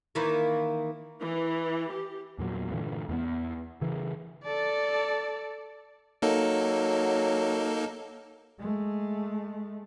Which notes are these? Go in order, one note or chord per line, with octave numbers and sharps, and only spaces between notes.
D#3 E3 A#3
E3
G4
E2 A#2 F#3
G2 A#2 D3 E3
E2 E3 A3 B3
C#3 E3
A4 D5
F#3 A#3 D#4 A4
G#3 A3